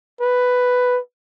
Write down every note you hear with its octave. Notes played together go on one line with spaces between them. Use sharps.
B4